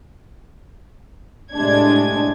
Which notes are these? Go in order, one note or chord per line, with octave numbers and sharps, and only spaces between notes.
A2 C3 G#3 D4 G#6